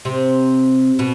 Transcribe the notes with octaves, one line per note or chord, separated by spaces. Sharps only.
C3
B2